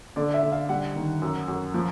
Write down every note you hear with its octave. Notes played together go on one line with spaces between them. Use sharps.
D3 D5
E5
D3
F5
G3 F#5
D#3
F#2
F#2
F3